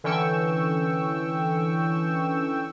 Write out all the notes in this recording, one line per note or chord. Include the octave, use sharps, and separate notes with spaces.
D3 E3 C#4 G5 C#6 E6